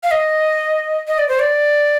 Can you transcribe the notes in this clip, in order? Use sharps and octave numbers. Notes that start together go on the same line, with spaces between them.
F5
D#5
D#5
D5
C5
D5